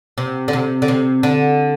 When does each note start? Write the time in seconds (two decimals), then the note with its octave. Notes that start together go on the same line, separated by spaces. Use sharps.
0.18 C3
0.48 D3
0.53 C3
0.82 D3
0.88 C3
1.23 D3